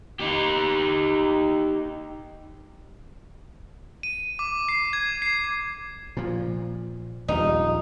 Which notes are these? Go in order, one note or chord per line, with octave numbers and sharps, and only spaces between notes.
D#4 G4
D#7
D6
C7
G#6
C7
A#2 F3
D#1 A#1 G3 D#4